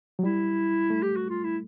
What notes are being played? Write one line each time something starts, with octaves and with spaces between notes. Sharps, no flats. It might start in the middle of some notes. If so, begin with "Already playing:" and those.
F#3
G3 E4
A3
G4
F#4
F4
E4